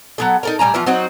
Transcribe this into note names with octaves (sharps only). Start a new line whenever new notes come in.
F#3 B3 A4
D#4 A4 A#4
A2 G3 G#5 A#5
E3 F3 B3 F4
F#3 C4 D#4 F#4